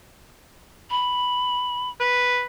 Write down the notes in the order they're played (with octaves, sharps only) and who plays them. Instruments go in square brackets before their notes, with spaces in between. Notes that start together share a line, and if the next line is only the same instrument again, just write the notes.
[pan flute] B5
[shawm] B4